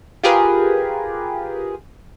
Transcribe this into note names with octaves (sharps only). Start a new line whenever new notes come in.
F4 G4 G#4 A#4 B4